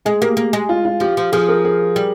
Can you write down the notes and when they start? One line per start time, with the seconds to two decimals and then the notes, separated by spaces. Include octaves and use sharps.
0.05 G#3 G#4
0.21 A#3 G4
0.37 A#3
0.53 G#3
0.69 F4
0.85 F4
1.00 F3 G4
1.17 F3
1.32 F3 G#4
1.49 A#4
1.65 G#4
1.96 G3